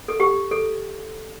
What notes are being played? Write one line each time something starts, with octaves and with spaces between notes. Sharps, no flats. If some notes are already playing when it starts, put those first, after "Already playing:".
A4
G4
A4